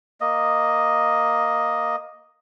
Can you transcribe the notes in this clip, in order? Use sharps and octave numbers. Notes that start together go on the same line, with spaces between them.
A#3 D#5